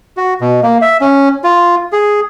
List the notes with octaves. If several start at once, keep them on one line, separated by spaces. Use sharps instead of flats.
F#4
B2
A#3
E5
C#4
F4
G#4